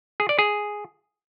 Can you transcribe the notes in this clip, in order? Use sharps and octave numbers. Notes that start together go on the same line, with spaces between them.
G#4
D5
G#4